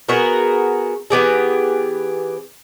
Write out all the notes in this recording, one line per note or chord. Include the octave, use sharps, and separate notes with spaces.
B3 F#4 G#4 A#4
E3 B3 G4 G#4